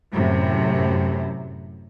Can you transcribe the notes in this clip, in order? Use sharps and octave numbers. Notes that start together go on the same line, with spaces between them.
F#2 A2 C3